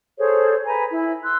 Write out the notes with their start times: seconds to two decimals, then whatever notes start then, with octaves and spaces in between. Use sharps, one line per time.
0.17 G#4 A4 C5 C#5
0.65 B4 G#5 A#5
0.90 E4
1.24 C6 E6 F#6